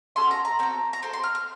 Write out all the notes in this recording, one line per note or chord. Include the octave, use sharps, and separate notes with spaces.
C#4 F#4 A4 C6
A#5
A#5
C4 F#4 A4 A#5
A#5
C4 F#4 A4 C6
C6
F6
F6